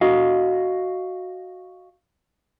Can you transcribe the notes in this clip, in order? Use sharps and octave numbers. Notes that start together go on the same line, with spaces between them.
F#4 D#5 F5